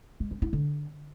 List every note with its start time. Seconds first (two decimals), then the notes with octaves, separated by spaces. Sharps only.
0.20 G#3
0.31 C4
0.42 E4
0.53 D3